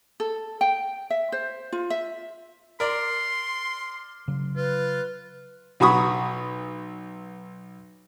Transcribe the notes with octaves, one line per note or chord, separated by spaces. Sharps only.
A4
G5
E5
C5
F4
E5
A#4 D5 C6
C#3 F#3
F4 B4
B1 F#3 B5 C#6 D#6